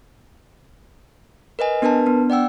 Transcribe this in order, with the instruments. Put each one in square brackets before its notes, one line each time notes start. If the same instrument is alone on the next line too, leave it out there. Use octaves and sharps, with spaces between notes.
[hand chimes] A#4 B4 D#5 G#5
B3 D4 A#4 B4 A5
B3 D4
D5 F#5 G5 E6